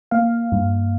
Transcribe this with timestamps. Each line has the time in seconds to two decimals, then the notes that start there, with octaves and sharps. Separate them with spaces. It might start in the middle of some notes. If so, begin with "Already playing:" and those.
0.11 A#3 F5
0.52 G2